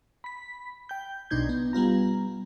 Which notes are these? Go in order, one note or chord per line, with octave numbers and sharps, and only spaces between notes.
B5 B6
G5 G6
B1 B2 D4 D#4 G6 G#6
B3
G3 B3 F4 A#5